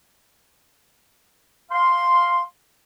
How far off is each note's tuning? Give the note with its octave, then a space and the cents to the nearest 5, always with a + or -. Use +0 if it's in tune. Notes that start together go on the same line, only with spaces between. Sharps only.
F5 +0 C6 +0